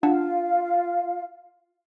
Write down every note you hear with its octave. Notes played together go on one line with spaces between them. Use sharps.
D4 F4 F5 F#5 A5